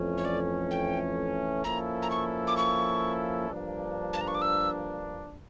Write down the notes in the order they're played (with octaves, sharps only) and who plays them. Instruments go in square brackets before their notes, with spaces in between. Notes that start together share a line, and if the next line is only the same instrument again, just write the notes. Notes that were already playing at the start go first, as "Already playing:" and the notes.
Already playing: [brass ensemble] F2 E3 A3 C#4
[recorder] C#5
D5
G5
[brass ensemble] F3 A#3 C#4 E4 A4 [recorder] A#5
[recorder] A#5
C#6
D6
C#6
[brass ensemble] G2 F3 A#3 D4
[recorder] A5
A#5
C#6
D6
E6